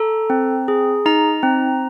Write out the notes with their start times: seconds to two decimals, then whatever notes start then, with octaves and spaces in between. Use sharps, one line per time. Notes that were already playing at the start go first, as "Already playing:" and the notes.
Already playing: A4 A#5
0.30 C4
0.68 G#4
1.06 D#4 A#5
1.43 C4